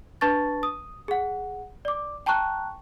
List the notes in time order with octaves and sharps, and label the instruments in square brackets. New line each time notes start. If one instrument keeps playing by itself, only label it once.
[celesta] D4 B4 A5 C#6 A6
D#6
G#4 F#5
D5 D6
G5 A5 A#5 C#6 F#6